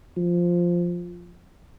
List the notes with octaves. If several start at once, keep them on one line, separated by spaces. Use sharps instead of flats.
F3